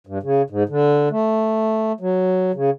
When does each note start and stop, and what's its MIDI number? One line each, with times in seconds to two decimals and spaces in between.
0.07 0.18 43
0.23 0.42 49
0.50 0.63 44
0.69 1.09 50
1.11 1.92 57
2.01 2.52 54
2.54 2.70 49